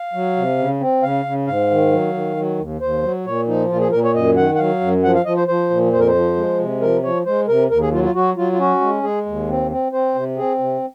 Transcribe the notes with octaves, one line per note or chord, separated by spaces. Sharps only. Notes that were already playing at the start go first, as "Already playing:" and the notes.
Already playing: F5
F#3
C3
C#3
C4
C#3 F5
C#3
G#2 F5
D#3
F#3
D#3
F#3
D#2
D#2 C5
F#3
A#2 C#5
F3 D#4
A#2 F4
G#4
A#2 A#4
C#5
F#2 D#5
D#3 F#5
F#5
F#3 F5
F#2
F3 F#5
F5
F3 D#5
C5
F3 C5
A#2
F2 C5
A#4
C5
F3
G#3
C3
F3 A#4
F3 C#5
G#3 C5
C3 A#4
D#2 A#4
G#4
F#3 F4
F4
F#3 F#4
F#3 F4
F4
C#4 F#4
G#3
G#3 G#4
D#2
C4
C4
C4 C5
C3
C4 G#4
C3